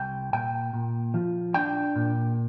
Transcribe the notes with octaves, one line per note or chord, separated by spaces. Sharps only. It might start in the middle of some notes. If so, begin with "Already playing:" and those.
Already playing: C2 G5
A#2 G5
A#2
F3
D4 G5
A#2